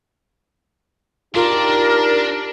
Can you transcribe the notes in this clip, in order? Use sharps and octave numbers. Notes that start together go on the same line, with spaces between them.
D4 D#4 F4 G4 A#4 D5